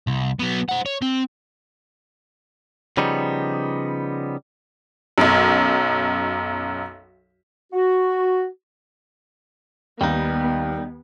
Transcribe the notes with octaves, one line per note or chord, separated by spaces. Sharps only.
C2
F#3 B3
C5 F#5
C#5
C4
C#3 F3 G3 B3 D#4
B1 F#2
F#4
D#2 G3 B3 D#4